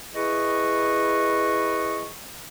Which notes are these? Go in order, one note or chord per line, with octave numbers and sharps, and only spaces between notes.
E4 G#4 B4 D#5 C#6